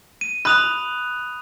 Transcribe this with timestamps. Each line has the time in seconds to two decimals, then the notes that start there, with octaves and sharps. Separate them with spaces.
0.21 D#7
0.45 B5 D#6 F#6 F7